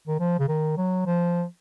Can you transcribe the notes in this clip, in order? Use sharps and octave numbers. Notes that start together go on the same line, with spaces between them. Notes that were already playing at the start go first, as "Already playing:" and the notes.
D#3
F3
C#3
D#3
F#3
F3